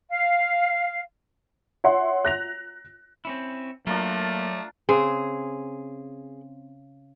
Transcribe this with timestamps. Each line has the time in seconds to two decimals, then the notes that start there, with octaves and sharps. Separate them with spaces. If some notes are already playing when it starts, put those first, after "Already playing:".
0.11 F5
1.84 C#5 E5 F#5 C6
2.25 F#6 A#6 F7
3.25 C4 C#4 E4
3.87 F#3 A3 A#3 D4 F4 A#4
4.89 C#3 C4 G#4